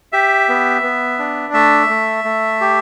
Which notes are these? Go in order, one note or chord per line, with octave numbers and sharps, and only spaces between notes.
G4 E5
B3
B3
D4
A3 E5
A3
A3
G4